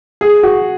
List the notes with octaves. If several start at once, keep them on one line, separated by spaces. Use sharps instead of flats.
G#4
F#4